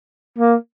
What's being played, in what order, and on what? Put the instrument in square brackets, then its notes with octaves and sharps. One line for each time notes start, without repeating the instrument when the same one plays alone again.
[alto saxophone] A#3